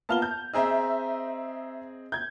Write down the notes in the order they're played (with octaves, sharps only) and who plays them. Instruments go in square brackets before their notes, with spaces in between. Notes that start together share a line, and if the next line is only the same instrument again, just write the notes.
[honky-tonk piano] A#3 B3 F4 [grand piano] A5 F6 G7
[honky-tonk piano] G6
[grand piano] C4 G#4 D#5 [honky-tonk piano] E5 A#5 E6
[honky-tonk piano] G6 G#6